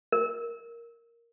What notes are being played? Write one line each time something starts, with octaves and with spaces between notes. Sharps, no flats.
A#4